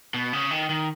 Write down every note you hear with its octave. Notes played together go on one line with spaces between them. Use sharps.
B2
C#3
D#3
D#3